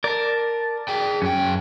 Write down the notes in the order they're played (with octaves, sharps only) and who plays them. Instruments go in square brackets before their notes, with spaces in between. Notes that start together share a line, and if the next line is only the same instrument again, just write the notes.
[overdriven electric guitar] A#4 [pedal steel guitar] D5 A5
[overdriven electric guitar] G#4 G5
[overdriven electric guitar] F#2 G5 [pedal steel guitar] C#4